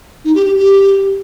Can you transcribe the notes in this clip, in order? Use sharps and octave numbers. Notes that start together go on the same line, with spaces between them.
D#4
G4
G4
G4